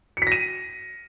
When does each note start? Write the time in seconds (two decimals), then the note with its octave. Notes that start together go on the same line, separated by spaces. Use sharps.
0.17 C#7
0.22 B6
0.27 A#6
0.32 D#7